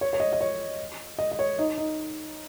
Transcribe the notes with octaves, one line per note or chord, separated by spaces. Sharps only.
C#5
C#5
D#5
D#5
C#5
D#5
D#5
C#5
D#4
D#4